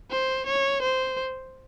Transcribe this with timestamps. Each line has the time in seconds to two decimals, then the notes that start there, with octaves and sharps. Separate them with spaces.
0.11 C5
0.47 C#5
0.82 C5